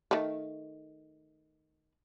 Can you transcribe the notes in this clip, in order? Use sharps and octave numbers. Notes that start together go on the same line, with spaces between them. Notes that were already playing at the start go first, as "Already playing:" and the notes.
D#3 A3